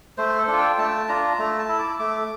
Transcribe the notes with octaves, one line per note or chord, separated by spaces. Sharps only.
A3 C5
A4
D4 F4
G5
A3 A5
D4 F4 A#5
A3
A5
E4
D6
A3 D6